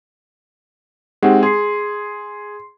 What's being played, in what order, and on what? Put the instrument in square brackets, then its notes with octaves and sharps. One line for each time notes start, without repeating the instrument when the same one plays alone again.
[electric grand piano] G#3 C4 [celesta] D#4 G4 F#5
[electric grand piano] G#4 [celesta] C6 C7